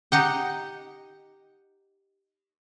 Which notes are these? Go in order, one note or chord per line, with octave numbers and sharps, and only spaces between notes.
D#4 G4 F#5 G5